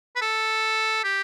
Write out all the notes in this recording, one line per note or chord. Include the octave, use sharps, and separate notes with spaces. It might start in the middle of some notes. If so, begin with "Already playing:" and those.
B4
A4
G4